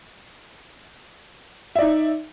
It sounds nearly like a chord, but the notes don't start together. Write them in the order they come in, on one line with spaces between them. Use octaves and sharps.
E5 D5 D#4